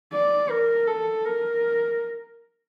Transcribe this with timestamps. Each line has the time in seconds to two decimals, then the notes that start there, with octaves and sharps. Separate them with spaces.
0.14 D5
0.51 A#4
0.88 A4
1.25 A#4